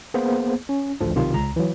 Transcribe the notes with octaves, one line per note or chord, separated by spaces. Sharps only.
A#3 B3 G#4 C5
C#4
A1 D2 D3 F3
B1 C3 D#3 F4
C#2 A#5
E3 F#3